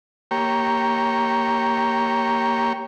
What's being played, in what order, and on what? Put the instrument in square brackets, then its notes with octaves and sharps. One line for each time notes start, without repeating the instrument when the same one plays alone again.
[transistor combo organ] A#3 G4 C#5